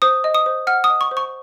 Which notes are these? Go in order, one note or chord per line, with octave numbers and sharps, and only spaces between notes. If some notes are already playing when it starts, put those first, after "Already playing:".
C5 D#6
D#5
D#6
C5
F#5 F6
D#6
D#5
C#6
C5
C#6